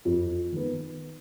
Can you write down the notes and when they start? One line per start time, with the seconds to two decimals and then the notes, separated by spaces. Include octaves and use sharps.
0.05 F2
0.52 D#3 B3